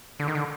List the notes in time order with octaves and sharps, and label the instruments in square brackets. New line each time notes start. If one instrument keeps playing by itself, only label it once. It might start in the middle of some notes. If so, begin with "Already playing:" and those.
[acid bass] D3
D#3
D3